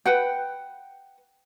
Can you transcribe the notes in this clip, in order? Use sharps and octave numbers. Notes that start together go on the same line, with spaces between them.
B4 F#5 G5